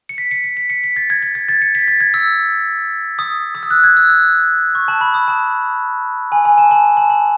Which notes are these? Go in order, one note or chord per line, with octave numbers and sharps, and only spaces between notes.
C#7
B6
C#7
C#7
B6
C#7
B6
A6
G#6
G#6
G#6
A6
C#7
B6
A6
G#6
E6
D#6
D#6
E6
F#6
G#6
E6
E6
C#6
A5
B5
D#6
A5
G#5
G#5
A5
A5
A5
A5